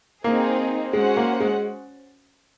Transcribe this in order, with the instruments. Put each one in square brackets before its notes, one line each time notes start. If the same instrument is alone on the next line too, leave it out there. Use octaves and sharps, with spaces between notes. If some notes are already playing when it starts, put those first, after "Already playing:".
[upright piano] A#3 [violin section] C4 D#4 G#4
[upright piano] G#3 [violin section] C#4 F#4 C5 F#5
[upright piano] A#3
G#3